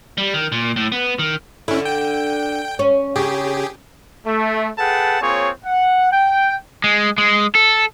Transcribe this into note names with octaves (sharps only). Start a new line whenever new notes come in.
G3
D#3
A#2
A2
B3
D#3
D3 C#4 E4
G5
C#4
C#3 G4 G#4
A3
G#4 A4 B4 F#5 G5 A5
A#3 C4 F4 G#4 C#5
F#5
G5
G#3
G#3
A4